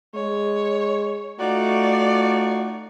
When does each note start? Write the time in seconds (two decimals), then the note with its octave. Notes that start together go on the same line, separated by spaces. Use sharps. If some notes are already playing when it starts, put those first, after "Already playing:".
0.15 G#3 C#5
1.40 A3 D#4 F4 F#4 D5